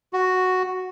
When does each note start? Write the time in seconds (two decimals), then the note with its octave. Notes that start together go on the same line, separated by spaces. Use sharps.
0.13 F#4